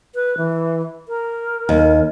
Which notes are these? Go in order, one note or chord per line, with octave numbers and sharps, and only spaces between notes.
B4
E3
A#4
D#2